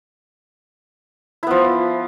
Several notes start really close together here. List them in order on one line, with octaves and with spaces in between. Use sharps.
E4 B3 F3